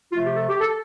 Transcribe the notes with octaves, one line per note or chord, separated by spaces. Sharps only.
C3 F3 A3 F4
G4
A4
G4
A4